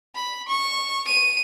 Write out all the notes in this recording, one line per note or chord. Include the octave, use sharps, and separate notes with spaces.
B5
C#6
D#7